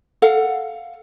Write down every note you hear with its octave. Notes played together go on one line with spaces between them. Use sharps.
A4 F5 F#5